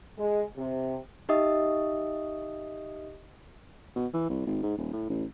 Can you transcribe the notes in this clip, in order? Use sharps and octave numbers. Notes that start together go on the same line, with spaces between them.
G#3
C3
D#4 G4 D#5 E5 D#6
B2
E3
C2
G#1
G#2
D#1
A2
A1